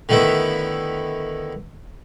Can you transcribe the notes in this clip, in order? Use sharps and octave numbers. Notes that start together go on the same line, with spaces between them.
D3 D#3 A3 B3 E4